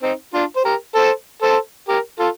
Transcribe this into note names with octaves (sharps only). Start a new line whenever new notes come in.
C4 D#4
D4 F4
C5
G4 A#4
A4 C5
A4 C5
G4 A#4
F4 A4